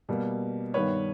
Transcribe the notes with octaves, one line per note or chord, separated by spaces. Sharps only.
B2 G3 A#3
G2 D#3 G3 B3 B4 C#5